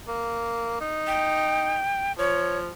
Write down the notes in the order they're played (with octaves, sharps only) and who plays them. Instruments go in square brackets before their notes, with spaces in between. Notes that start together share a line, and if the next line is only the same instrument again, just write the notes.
[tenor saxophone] A#3
D#4
[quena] G5
[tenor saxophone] F3 [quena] C#5